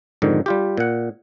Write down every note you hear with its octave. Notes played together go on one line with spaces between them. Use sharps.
F2 G#2 D3 D#3
G3 F4 G4
A#2 F#5